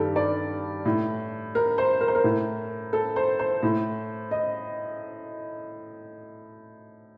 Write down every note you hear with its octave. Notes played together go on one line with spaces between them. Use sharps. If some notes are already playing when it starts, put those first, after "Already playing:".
Already playing: G2 D#3 G4 A4
D5
A2
A#4
C5
A#4
C5
A#4
A2
A4
C5
C5
A2
D#5